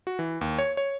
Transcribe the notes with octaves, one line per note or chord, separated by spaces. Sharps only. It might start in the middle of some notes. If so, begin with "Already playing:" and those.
F#4
E3
D#2
C#5
C#5